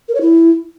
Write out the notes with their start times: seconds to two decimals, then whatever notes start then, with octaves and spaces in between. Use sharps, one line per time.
0.09 A#4
0.15 C#5
0.21 E4